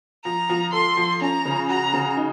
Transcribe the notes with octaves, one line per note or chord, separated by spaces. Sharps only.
F3 A#5
F3
A4 C6
F3
C#4 A#5
C#3
F#4 A#5
C#3
D#4